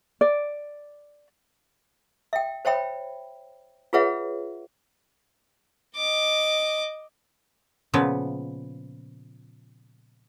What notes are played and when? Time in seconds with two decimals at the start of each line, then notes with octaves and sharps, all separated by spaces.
0.21 D5
2.33 E5 G5
2.65 C5 C#5 E5 G5 B5
3.93 F4 G#4 B4 C#5 E5 F#5
5.97 D#5 D6
7.94 A#2 C#3 F3 B3